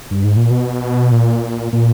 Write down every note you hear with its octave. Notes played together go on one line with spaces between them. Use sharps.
G2
G#2
A#2
B2
A#2
A#2